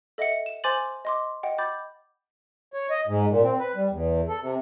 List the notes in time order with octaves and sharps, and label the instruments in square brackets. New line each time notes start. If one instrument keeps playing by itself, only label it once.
[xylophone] A4 D#5 E5 F#5 C#7
E7
C5 G#5 C6 D6 A6 F#7
D#5 C6 D6
D#5 F#5 G5
B5 D6 G6 A6
[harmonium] C#5
D#5
G#2
A#2
C4
B4
G3
E2
A4
C3